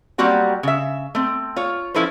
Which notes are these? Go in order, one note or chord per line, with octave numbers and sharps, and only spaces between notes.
F#3 G3 A#3 C4 F#4 F#5
C#3 E5
A3 C4
F4 C#5
F3 C#4 E4 A4 B4 C5